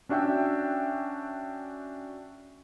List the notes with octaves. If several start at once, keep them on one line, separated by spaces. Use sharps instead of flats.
C#4 D4 F#4 E5 G5